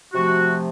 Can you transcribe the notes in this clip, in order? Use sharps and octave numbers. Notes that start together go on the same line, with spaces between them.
C3 F3 A3 F#4